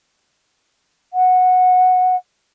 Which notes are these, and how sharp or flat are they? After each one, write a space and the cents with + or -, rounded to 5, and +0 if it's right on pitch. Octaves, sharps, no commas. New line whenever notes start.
F#5 -10